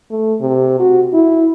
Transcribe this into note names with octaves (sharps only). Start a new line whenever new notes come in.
A3
C3
F#4
E4